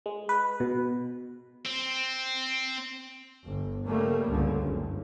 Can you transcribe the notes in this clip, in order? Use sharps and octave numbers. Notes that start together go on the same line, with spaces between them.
G#3
B4
B2
C4
G1
C#3 G3 A3 A#3
C#2 G2 D3
F#1